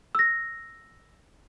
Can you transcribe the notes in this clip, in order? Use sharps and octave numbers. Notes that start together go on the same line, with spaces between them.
E6 A#6